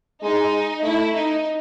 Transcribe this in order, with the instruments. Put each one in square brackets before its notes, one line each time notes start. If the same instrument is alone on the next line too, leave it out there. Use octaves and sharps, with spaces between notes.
[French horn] G#3 [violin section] D#4
[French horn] A3 [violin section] E4
[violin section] D#4